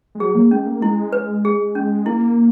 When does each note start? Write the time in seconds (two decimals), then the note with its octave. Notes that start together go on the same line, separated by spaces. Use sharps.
0.15 G#3
0.19 F#3 G#4
0.35 A#3
0.51 G#3 C#4
0.66 A#3
0.82 G#3 E4
1.12 B4
1.45 G#4
1.75 C#4
2.06 A#3 E4